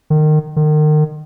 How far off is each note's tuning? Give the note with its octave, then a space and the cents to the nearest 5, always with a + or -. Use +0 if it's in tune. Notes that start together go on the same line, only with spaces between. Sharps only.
D#3 -25
D#3 -35